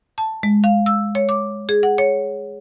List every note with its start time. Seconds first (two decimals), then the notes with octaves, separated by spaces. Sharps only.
0.18 A5
0.43 G#3
0.64 F5
0.86 E6
1.15 C#5
1.29 D6
1.69 G#4
1.83 F#5
1.98 C#5